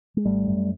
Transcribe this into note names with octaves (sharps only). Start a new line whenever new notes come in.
G#3
G#1 G3 A3
F#2